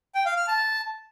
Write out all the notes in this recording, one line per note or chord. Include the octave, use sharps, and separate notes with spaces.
G5
F5
F6
A5